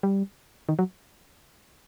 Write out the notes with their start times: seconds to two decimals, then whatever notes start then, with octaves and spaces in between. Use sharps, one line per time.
0.03 G3
0.69 D#3
0.79 F#3